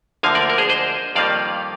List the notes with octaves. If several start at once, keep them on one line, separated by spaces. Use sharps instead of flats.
D2 D3 F3 A#3 F5 G#5
A#4 D5
A#4
G#4 C5
C5 D#5
F2 D#3 G3 A#3 F4 D5 F5